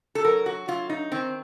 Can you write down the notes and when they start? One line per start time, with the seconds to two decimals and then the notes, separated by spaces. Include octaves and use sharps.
0.15 A4
0.24 F#3 A#4
0.46 F#4
0.68 F#3 F4
0.89 D#4
1.12 D#3 C4